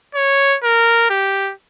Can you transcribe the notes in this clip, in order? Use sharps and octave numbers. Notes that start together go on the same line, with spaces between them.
C#5
A#4
G4